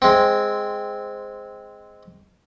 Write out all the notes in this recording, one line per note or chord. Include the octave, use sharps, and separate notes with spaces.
G#3 C4